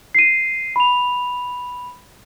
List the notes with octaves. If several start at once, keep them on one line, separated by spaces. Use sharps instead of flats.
C7 D#7
B5 F7